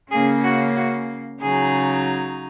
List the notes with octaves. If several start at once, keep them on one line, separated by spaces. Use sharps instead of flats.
C#3 A#3 C#4 G#4
F#4
F#4
C#3 F#3 D#4 G#4